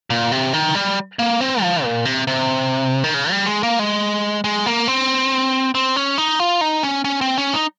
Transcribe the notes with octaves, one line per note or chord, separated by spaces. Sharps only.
A#2
C3
D#3
G3
A#3
C4
F3
A#2
C3
C3
D#3
C#3
G3
G#3
A#3
G#3
G#3
A#3
C4
C4
C#4
D#4
F4
D#4
C#4
C#4
C4
C#4
D#4